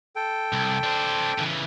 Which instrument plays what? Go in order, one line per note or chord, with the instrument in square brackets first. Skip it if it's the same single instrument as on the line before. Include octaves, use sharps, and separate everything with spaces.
[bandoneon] A4 G5
[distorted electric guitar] C2
D4 C5
C#3 E3